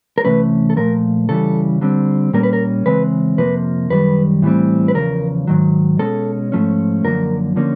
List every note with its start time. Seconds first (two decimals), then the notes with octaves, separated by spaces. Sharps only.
0.18 A#4
0.24 C3 E3 A3 C#4 B4
0.70 A4
0.77 A#2 F3 A3 A#4
1.29 C#3 E3 G3 A4
1.81 D3 G3 C4
2.33 A#2 G3 A#3 C#4 A#4
2.43 B4
2.53 A#4
2.86 C#3 E3 G#3 C4 B4
3.38 F2 C3 F3 A#3 B4
3.90 F#2 D#3 G3 B4
4.42 A2 E3 G3 C4
4.88 B4
4.94 E2 C#3 F3 A#4
5.47 G#2 D#3 F#3
5.99 B2 G#3 C#4 A4
6.52 G#2 F3 A3 C#4
7.04 F#2 D3 F3 A#3 A#4
7.56 D3 F3 A#3 C#4